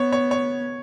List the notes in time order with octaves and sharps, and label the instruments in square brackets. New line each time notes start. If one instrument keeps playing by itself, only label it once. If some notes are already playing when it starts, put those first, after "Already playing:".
Already playing: [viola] B3 [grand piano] C#5
[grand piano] C#5
C#5